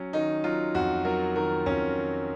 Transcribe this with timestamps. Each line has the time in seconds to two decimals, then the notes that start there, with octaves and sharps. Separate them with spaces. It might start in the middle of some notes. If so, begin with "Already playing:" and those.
Already playing: F#3 C#4
0.13 D#3 D#4
0.44 F#3 F4
0.75 F2 F#4
1.05 F#3 A#4
1.36 D#3 A#4
1.66 F2 C#4
1.97 D#3